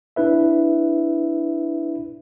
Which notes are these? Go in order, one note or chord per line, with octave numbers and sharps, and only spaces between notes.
D4 E4 B4 E5